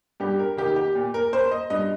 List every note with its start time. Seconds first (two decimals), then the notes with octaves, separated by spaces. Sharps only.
0.20 G2 G4
0.39 A#4
0.57 D#3 A#3 G4
0.76 G4
0.95 A#2
1.14 A#4
1.32 A#3 C5
1.51 D#5
1.70 G2 D#5